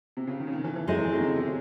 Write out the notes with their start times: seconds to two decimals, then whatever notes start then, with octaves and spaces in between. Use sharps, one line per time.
0.17 C3
0.27 C#3
0.40 D#3
0.47 C#3
0.52 D#3
0.64 E3
0.76 E3
0.87 F#3 G#3 C4 E4 A4 D#5
0.99 E3
1.12 F#3
1.20 D#3
1.23 C#3
1.35 C3